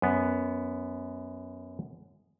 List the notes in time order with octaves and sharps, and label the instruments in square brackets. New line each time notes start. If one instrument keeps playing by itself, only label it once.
[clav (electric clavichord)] F#2 B3